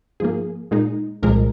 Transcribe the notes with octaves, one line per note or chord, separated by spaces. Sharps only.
G#2 F3 A#3 G#4
A#2 G#3 D#4
C2 A#2 F3 G#3 A#4